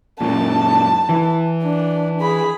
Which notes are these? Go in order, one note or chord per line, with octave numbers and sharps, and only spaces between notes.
F#2 A#2 A5
E3
D4
G#4 B5